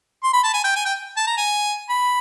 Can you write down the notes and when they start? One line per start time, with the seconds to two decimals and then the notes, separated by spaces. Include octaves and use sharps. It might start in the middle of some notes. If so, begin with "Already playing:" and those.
0.23 C6
0.33 B5
0.43 A5
0.54 G#5
0.64 G5
0.76 G#5
0.86 G5
1.17 A5
1.27 A#5
1.37 G#5
1.90 B5